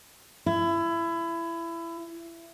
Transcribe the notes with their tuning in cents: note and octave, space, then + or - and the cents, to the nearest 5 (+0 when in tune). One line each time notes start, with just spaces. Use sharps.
E4 +25